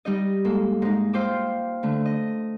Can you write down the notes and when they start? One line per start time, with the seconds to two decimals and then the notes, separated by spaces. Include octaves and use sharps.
0.05 G3 D#4 D#5
0.45 G#2 A#3 A4
0.82 G#2 D#4
1.13 F4 C5 G5 D6 E6
1.83 D3 A3
2.05 D#5